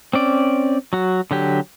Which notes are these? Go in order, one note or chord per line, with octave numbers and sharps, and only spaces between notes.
C4 C#4 D5
F#3 F#4
D3 F#3 G4